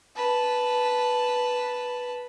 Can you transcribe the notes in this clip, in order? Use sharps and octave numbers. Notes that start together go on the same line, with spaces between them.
B4 A5